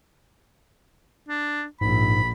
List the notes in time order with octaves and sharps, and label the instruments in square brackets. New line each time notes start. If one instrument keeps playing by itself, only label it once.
[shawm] D4
[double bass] A#1 [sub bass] G#2 [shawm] B5